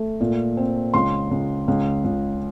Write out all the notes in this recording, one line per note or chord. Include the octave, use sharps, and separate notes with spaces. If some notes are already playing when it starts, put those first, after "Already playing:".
Already playing: A3
A#2
C4
C#2 C6
C#2
C#2
C#2